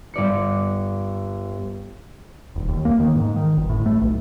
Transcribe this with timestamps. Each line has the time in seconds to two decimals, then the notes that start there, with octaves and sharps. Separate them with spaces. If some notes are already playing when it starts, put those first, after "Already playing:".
0.14 G1 D5 C#7
2.56 D#1
2.69 D#2
2.85 A#3
3.00 D#3
3.15 G#2
3.36 D#3
3.57 G1
3.70 A2
3.86 A3
4.01 B1